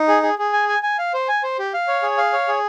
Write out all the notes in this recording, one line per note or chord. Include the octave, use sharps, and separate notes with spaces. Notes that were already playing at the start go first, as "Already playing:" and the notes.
Already playing: D#4
G#4
G#4
G#4
G#5
G#5
G#5
F5
C5
G#5
C5
G4
F5
C#5
G#4
F5
C#5
G#4